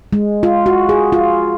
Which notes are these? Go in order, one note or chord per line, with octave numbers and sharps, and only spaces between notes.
G#3
F4
F#4
G#4
F4